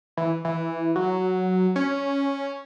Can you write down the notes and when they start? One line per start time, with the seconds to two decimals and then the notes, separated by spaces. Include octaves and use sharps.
0.17 E3
0.45 E3
0.96 F#3
1.76 C#4